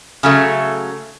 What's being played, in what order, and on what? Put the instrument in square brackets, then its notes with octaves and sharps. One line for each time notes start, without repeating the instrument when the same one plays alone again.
[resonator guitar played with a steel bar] C#3 F#3 A3